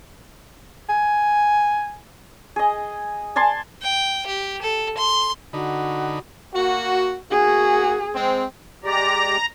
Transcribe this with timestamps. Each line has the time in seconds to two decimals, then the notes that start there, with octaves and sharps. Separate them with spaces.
0.89 G#5
2.56 G#4 D#5
3.36 D5 G#5 A5 C6
3.83 G5
4.27 G4
4.62 A4
4.97 C6
5.53 D3 D#4 F#4 B5
6.54 A#3 F#4
7.31 A#3 F#4 G#4
8.15 G#3 C4
8.84 G#3 G4 D5 A#5